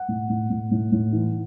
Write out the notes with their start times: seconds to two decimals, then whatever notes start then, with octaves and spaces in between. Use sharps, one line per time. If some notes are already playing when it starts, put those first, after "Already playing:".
Already playing: F#5
0.08 A2
0.29 A2
0.50 A2
0.71 A2
0.92 A2
1.12 E3